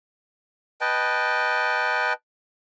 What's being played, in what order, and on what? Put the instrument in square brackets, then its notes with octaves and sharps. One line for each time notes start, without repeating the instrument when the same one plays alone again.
[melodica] B4 D#5 G5 A5